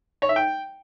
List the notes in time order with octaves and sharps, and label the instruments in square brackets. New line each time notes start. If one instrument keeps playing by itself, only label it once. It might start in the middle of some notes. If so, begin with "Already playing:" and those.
[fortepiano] C#5
E5
G5